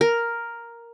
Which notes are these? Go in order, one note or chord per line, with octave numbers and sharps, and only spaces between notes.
A#4